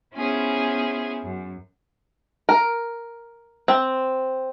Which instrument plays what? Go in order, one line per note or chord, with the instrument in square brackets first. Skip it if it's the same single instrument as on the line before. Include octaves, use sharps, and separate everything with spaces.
[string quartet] B3 C#4 E4 F4 G#4 C5
F#2
[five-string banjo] A#4
C4